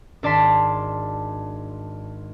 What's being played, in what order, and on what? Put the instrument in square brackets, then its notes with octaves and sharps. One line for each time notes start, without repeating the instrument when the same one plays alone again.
[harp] G#1 D4 D5 A5 C6 B6